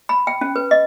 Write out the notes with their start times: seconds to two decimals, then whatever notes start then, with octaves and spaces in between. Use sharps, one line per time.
0.09 B5
0.27 G5
0.41 C#4
0.56 B4
0.71 D#5